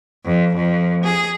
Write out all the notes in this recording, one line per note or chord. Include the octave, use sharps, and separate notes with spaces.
F2
F2
G#4